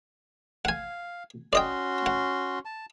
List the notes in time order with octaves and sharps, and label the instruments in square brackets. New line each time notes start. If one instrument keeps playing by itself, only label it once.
[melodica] F5 [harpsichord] F#5 G#5
[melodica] C#4 F#4 C6 [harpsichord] D5 D#5 G5
[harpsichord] F#5
[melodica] A5